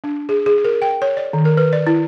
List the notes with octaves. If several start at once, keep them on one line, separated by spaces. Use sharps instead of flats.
D4
G#4
G#4
A#4
G5
C#5
D5
D#3
A#4
B4
D5
E4